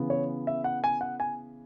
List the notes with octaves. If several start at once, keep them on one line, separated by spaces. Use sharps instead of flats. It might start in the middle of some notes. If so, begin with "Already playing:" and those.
Already playing: C#3 E3 B3
C#5
E5
F#5
G#5
F#5
G#5